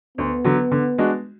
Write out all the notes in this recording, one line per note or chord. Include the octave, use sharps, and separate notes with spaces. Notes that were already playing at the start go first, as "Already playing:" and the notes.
D2 B3
D3 F#3
D3
G#3 D4 F#4